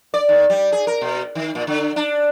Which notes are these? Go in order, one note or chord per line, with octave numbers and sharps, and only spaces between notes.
D5
D#3
G3
G#4
A#4
B2
D#3
A#2
D3
D4